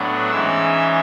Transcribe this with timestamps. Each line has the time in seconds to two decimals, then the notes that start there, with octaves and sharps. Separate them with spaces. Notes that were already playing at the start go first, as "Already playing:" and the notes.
Already playing: A2 F#3 B3 D4 D6
0.30 G#2 E3 G#3 C#4 E4 E6